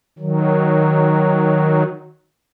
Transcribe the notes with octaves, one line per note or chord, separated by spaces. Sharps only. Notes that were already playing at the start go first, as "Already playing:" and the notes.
D#3 F#3